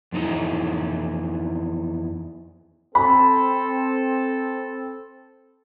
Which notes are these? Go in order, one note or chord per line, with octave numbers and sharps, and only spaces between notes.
F2 E3 A#3 D#4 E4
C4 A4 B5